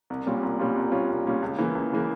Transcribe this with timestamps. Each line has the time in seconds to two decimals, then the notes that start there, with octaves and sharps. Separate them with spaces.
0.10 C2
0.26 A#2 G3 C#4 F4
0.43 C2
0.59 A#2 G3 C#4 F4
0.76 C2
0.92 A#2 G3 C#4 F4
1.09 C2
1.26 A#2 G3 C#4 F4
1.42 C#2
1.58 C#3 E3 A#3
1.75 C#2
1.92 C#3 E3 A#3